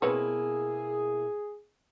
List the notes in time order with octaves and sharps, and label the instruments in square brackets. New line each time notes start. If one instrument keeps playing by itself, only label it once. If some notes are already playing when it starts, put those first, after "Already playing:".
[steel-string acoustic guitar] B2 A#3 E4 [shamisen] C4 B4 C#5 [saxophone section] G#4